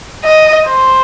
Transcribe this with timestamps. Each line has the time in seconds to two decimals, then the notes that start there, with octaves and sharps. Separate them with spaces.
0.24 D#5
0.67 C5